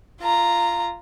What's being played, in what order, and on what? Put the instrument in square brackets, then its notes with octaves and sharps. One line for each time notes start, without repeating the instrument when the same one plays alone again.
[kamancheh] F4 A#5